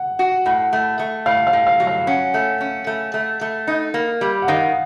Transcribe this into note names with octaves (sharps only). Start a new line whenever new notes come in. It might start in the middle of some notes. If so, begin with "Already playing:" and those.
Already playing: F#5
F#4
A2 F#5
A3
A3
A2 F5
F5
A2
F5
F#3
F5
C#4 F#5
A3
C#4
A3
A3
A3
D#4
A#3
G3
F#5
D#3 F5